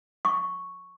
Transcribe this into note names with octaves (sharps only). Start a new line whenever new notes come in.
C#6